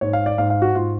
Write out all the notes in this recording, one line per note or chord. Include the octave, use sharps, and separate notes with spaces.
G#2 C#5
F5
D5
G#2 F5
F5
F#4
G#2 F4